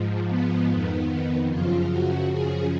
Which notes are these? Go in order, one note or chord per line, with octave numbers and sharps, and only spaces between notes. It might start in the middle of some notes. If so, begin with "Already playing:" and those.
Already playing: G#2 F3
B3
F2 D#3
F#2 C#3 F3 F4
F#4
F#2 C#3 F3 G#4